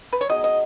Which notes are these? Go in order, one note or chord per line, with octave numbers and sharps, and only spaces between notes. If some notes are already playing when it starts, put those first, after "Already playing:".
B4
C#5
F#3 B3 D#4 G#4 D#5
D#5